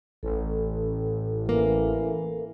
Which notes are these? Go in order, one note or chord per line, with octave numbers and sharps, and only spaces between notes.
A1 A4
E3 A#3